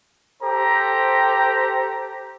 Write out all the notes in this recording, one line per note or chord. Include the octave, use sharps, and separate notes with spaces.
G4 A4 C5 A#5